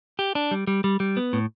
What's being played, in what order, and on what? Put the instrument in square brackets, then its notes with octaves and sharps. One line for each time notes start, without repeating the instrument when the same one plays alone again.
[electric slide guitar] G4
D4
G3
G3
G3
G3
B3
A2